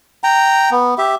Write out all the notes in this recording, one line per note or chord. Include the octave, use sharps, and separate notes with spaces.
G5 A#5
B3
G4 E5